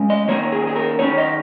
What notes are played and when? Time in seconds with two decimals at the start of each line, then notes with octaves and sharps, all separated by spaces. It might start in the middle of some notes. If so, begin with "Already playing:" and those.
Already playing: G#3 C#4
0.10 D#5
0.28 D#3 A#3 C#4 C#5
0.52 G#4
0.67 G#4
0.76 A#4
0.99 D#3 C#4 C#5
1.18 D#5